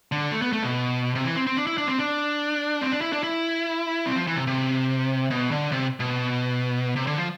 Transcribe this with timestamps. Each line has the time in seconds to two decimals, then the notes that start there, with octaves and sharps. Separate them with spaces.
0.12 D3
0.32 A3
0.42 B3
0.53 A3
0.63 B2
1.15 C3
1.25 E3
1.36 C4
1.47 C4
1.57 D4
1.67 E4
1.78 D4
1.87 C4
1.99 D4
2.82 C4
2.92 D4
3.01 E4
3.13 D4
3.23 E4
4.06 C4
4.16 F3
4.27 E3
4.36 C3
4.47 C3
5.31 B2
5.51 D3
5.72 C3
6.00 B2
6.96 C3
7.07 D3
7.17 F3